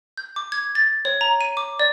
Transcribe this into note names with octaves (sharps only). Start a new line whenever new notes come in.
G6
D6
G#6
A6
C#5
A#5
D#7
D6
D5